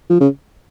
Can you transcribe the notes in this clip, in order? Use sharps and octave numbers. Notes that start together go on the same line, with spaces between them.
F3
C#3